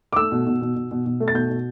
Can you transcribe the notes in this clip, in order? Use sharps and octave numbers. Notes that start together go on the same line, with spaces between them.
D6
A3 E6
B2
B2
B2
B2
B2
B2
A3
A6
B2 G6
B2